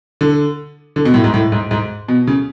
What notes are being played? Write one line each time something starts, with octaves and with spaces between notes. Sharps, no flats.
D3
D3
B2
A2
G#2
A2
G#2
G#2
B2
C#3